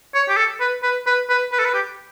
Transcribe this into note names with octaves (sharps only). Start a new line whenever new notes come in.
C#5
G4
A4
B4
B4
B4
B4
B4
A4
B4
G4